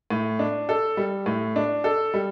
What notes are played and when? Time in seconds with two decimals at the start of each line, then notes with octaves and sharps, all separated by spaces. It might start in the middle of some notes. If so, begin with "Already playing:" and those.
0.10 A2
0.39 D4
0.69 A4
0.97 G3
1.26 A2
1.56 D4
1.84 A4
2.14 G3